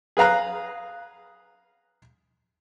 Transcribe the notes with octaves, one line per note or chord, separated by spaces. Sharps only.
G#4 B4 F5 A#5 F#6